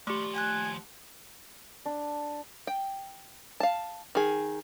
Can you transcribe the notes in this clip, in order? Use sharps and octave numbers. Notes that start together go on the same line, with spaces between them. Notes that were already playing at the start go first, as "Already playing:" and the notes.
D#2 F3 A3 G4 C#6 E6
F#5 G#5 A5 F#6
D4
G5
F5 A5
D#3 G#4